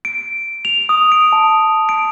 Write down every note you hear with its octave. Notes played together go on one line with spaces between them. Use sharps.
D7
F7
D#6
D7
A5
D7